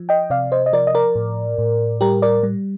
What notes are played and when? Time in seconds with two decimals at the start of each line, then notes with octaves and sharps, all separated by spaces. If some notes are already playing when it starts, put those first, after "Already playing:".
Already playing: F3
0.09 D#5 G5
0.30 C3 D5 F5
0.52 C5 D#5
0.66 D#5
0.73 F3 A#4 D5
0.87 D#5
0.94 A#4 D5
1.15 A2
1.58 A2
2.01 G3 G4 A#4
2.22 A#4 D5
2.43 G3